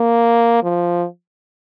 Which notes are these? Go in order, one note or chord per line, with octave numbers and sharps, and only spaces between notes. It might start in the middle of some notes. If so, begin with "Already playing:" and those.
Already playing: A#3
F3